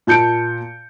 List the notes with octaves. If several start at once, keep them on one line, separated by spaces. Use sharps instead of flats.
A#2 A5 G6 C#7 D7